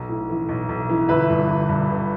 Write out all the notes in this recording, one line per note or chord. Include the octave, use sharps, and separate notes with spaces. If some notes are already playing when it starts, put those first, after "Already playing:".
Already playing: B1
A2
E3
B1
B1
E3
G1 B4 E5
G2
G1
G2
G1